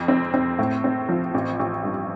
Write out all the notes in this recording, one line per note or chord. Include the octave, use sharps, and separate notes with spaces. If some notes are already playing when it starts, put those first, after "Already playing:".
Already playing: F2
C4
C4
A2
C4
F3
A1
A1
G2